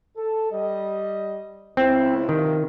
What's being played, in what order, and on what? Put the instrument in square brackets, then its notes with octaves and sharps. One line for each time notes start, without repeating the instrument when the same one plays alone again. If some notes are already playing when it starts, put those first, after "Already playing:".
[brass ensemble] A4
G3 D#5
[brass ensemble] C#2 E4 [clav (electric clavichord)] C4
[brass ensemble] G2 C3 F3 [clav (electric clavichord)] D#3